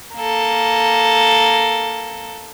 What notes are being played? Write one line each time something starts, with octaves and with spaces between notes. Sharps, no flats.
A#3 A4